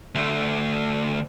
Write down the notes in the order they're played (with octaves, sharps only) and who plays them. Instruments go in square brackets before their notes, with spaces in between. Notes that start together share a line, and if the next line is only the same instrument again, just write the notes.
[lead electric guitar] D2 A3